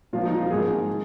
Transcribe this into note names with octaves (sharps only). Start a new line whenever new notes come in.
A#2 F3 C4 F4
D#4
F4
G#2 F3 A#3 G#4
D#3